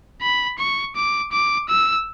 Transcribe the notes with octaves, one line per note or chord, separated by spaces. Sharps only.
B5
C#6
D6
D6
E6